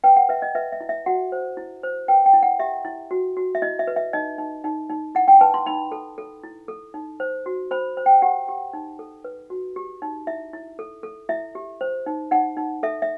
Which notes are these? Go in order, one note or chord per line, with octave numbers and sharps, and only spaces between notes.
B4 G5
F#5
B4 E5
D#5
B4 E5
E5
E4
E5
F#4 F#5
C5
E4
C5
B4 G5
G5
E4
F#5
G4 E5
E4
F#4
F#4
E5
E4 D#5
E5
B4
E5
D#4 D#5
D#4
D#4
D#4
E4 F#5
G5
B4 A5
C6
D#4 B5
A4
A4
E4
A4
D#4
C5
F#4
C5 B5
C5
G5
G4 F#5
G4
D#4
A4
B4
F#4
G4
D#4
E4 E5
E4
A4
A4
E4 E5
G4
C5
D#4
D#4 F#5
D#4
A4 E5
E5